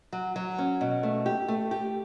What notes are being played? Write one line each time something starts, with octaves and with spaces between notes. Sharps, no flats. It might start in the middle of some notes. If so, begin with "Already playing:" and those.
F#3
F#3
C#4
B2
A3
G4
A3
G4